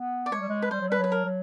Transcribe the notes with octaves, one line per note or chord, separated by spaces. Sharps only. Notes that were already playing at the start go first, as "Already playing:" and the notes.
Already playing: B3
D5
G#3 C#5
G3
G#3
B4
G3 C5
F#3
G3 B4
F#3
B4
A#4
F#3